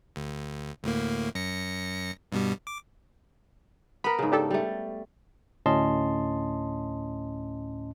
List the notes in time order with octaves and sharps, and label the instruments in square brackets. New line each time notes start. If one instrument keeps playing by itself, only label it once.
[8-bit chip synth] D2
D2 A2 A#3
F#2 A#6 C#7
G2 B2 G3
D6
[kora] B3 A#4 [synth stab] B5
[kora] G#2 C#3
[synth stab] D4 G4 A4
[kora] G3 A3
[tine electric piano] D2 A2 C#4 D#5 A5 C6